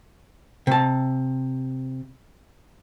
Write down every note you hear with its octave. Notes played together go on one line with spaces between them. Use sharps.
C3 A5